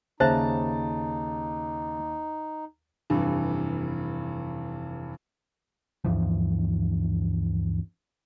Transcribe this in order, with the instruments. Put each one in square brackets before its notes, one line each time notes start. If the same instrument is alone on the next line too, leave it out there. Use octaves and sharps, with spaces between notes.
[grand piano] D#2 A5 A6 [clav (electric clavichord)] C#3 [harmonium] D#4 [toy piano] C5 E5
[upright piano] F1 G2 E3
[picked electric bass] D2 G2 E3 F3